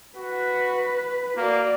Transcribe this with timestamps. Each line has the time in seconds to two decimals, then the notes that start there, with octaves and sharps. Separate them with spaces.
0.17 F#4 B4
1.37 A#3 F#4 D5